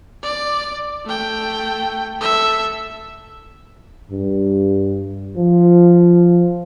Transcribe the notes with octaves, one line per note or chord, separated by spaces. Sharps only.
D5
A3 G5
A4 E5
G2
F3